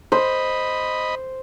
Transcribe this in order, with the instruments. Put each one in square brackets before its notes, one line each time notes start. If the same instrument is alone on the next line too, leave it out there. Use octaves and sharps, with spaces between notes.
[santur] C5 [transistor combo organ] D#5 B5